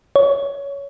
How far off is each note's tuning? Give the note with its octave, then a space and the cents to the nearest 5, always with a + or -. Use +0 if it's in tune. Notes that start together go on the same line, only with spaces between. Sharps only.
C#5 +15